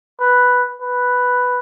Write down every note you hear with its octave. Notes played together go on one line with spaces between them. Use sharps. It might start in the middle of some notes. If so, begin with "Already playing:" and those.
B4
B4